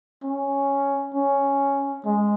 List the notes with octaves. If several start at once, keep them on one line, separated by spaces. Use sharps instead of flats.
C#4
C#4
G#3